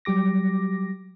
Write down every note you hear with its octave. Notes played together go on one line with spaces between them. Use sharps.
F#3 G3 G4 D6 A#6